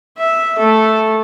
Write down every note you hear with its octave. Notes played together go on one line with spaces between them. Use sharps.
E5
A3 A4